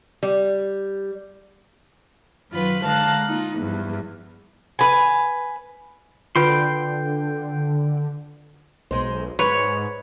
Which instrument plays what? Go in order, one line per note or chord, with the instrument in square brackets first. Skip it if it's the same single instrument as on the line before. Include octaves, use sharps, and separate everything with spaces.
[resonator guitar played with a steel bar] G3
[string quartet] F#2 D#3 F#3 F4 B4 B5
D3 G#3 F5 A5 A#5 F#6
A#3 D#4 F4
E2 G2 F3
[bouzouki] B4 G#5
[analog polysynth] D3 [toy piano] F4 B4 [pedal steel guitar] G5 C6
[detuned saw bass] B1 [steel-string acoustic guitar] G#3 D#4 C5
[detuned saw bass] G#2 [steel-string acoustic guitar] G#3 [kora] B4 [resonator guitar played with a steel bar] C#5